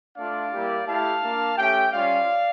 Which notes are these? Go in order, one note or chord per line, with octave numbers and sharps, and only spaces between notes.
A3 D4 F4 D5 F5
G3 A#3 E4 G4
A3 E4 G4 F5 A5
A#3 D4 F4
A3 C#4 G4 E5 G5
G3 C#4 F4 D5 F5